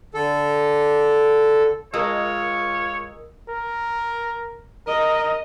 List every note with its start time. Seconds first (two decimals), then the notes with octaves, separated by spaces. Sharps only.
0.14 D3 A4
1.94 G#3 F4 A#4 C#5 D#6 E6
3.49 A#4
4.87 A#4 D#5